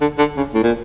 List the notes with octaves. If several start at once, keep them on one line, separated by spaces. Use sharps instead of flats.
D3
D3
C#3
A2
A#2